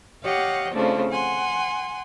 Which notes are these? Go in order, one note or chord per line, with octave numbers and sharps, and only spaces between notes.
G4 C#5 D#5 F5 F#5
C#3 F3 A3 C4 D4
F#5 G#5 C6